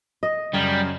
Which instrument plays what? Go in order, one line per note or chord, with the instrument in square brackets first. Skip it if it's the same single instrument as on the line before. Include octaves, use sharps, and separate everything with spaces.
[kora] D#5
[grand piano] F#2 C#3 [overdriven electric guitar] G3